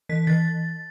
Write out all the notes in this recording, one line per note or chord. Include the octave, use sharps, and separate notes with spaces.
E3 B6
E3 A6